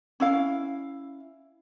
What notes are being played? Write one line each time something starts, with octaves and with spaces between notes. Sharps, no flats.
C#4 E4 F5